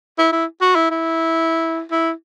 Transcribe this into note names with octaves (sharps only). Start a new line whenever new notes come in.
E4
E4
F#4
E4
E4
E4